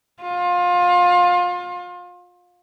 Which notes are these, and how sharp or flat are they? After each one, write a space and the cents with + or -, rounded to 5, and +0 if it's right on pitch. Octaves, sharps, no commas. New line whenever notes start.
F4 +25